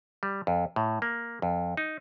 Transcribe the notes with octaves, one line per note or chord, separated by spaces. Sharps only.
G3
F2
A2
A#3
F2
D#4